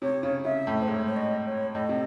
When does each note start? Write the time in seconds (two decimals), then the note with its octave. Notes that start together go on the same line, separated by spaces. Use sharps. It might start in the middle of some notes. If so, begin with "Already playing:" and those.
0.02 C3 C#5
0.23 C#3
0.45 C#3 E5
0.67 A2
0.81 C5
0.88 G#2 C#5
1.06 C#5
1.16 D#5
1.46 C#5
1.75 A2 D#5
1.89 C3